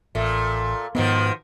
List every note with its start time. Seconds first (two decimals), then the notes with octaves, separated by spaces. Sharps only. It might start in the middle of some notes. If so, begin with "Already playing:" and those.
0.15 A1 A#2 A3
0.95 G#2 B2 D#3 F3 B3